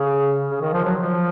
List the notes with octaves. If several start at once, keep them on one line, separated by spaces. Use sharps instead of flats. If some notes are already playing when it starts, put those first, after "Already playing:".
Already playing: C#3
C#3
D#3
F3
F#3
F3